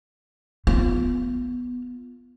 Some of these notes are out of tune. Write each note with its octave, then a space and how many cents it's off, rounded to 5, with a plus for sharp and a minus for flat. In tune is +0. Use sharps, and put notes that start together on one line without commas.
B3 +0 F4 +0